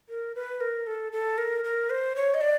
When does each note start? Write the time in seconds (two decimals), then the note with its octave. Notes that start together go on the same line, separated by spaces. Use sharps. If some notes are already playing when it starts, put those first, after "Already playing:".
0.09 A#4
0.35 B4
0.60 A#4
0.87 A4
1.12 A4
1.38 A#4
1.64 A#4
1.90 C5
2.16 C#5
2.34 D#5
2.41 D5